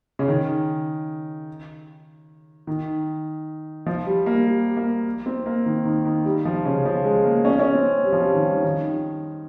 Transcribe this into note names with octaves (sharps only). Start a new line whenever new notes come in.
C#3
D#3
D#3
F3
G3
A#3
G3
A#3
C4
A#3
D#3
D#3
D#3
G3
F3
C#3
F3
G#3
A#3
C#4
C#4
C4
G3
F3
G3
D#3
D#3